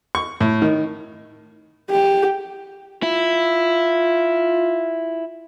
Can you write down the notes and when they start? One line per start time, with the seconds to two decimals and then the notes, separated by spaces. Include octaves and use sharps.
0.15 C#6
0.41 A2
0.62 D#3
1.90 G4
3.03 E4 F4